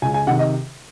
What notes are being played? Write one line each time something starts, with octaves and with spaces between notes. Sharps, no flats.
C#2 G#5
G#5
C3 D#3 F#5
D#5